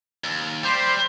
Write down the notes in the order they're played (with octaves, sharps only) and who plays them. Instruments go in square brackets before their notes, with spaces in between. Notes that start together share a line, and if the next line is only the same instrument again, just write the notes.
[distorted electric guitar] D#2
[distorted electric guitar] G3 [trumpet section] G4 C5